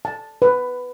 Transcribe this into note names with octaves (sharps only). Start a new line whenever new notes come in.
A5
B4